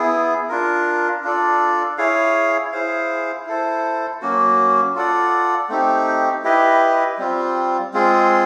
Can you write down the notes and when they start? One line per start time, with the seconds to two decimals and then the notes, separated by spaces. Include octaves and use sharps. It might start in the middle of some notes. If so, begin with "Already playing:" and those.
Already playing: B3 E4 G#4
0.49 D4 F4 A#4
1.24 D4 F4 A4 D5
1.98 E4 G#4 C#5 F5
2.72 E4 G#4 C5 F5
3.46 E4 A4 C5
4.22 F#3 A#3 C#4 F#4
4.95 F4 A4 D5 F#5
5.69 A3 C4 D#4 G4
6.44 E4 G4 B4 D#5
7.18 G3 C4 F4
7.93 G#3 C4 F4 G#4